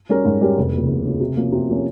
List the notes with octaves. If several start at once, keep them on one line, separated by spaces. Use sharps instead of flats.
G3 C#4 G4 A#4
G#2
G3 C#4 G4 A#4
F1
D#2 C#3 F3
F1
D#2 C#3 F3
C3
F3 A#3 C#4
C3
F3 A#3 C#4